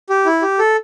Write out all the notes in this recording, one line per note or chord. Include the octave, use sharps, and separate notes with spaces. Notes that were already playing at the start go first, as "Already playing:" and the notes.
G4
E4
G4
A4